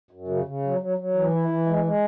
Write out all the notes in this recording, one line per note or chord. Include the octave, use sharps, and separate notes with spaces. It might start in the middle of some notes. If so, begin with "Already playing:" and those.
F#2
C#3
C#3
F#3
F#3
F#3
E3
E4
E3
G#3
G#3